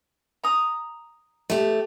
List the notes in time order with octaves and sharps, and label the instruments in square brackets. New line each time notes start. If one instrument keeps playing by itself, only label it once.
[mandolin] A#5 D#6
[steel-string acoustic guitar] A3 G4